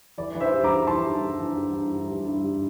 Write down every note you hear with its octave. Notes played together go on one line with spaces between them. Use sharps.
E3 D5
E3
C5 E5
G3
A#5 D6
E3
E3 A5 C6
G3
G2
E3
G2
G2
G2
G3
G2
G2